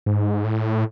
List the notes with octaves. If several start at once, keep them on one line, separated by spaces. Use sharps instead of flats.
G#2
A2